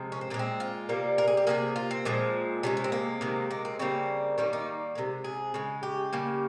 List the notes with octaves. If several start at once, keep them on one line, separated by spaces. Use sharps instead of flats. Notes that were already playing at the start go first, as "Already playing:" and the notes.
Already playing: C3 F3 G#3
C#4
C4
A#2 G#3 A#3
C4
F4
C3 G3 A#3
A#4
G#4
G4
C3 F3 A#3 G#4
F4
C4
A#2 F3 G#3
C3 D#3 G#3 C#4
C#4
C4
A#3
C3 D#3 G#3
A#3
C4
C#3 G3 A#3 C4
D#3 G3 A#3 C#4
D#4
C3 D#3 G#3
G#4
C#3 G#3
G4
C#3 G3 A#3